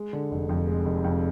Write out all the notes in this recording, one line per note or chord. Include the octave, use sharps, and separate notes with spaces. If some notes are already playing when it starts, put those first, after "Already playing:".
Already playing: G#3
D3
F1
F2
G#3
F1
F2